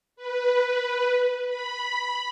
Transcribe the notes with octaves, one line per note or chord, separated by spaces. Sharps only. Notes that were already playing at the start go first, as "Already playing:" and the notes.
B4
B5